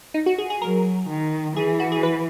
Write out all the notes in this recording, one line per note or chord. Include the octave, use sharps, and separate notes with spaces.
D#4
F#4
G#4
G#4
F#3 A#4
D#3
E3 G#4
F#4
G#4
B4